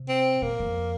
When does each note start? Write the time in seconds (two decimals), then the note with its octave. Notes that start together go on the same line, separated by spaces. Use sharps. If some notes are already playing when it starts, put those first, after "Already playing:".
Already playing: C3
0.08 C4
0.42 A#2 A#3
0.60 F2